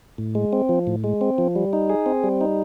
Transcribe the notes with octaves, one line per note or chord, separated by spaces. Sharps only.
A2
G#3
C4
F3
A2
G#3
C4
F3
G3
D#4
G#4
C4
G3
D#4